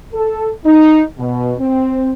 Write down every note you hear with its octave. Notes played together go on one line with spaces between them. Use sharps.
A4
D#4
B2
C4